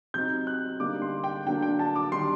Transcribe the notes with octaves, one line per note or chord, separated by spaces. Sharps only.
C3 F#3 C4 D#4 G6
F#6
D3 G3 A#3 D#4 D6
C6
G5
D3 F#3 A#3 D4 G5
G5
A5
D6
D#3 G3 D4 C6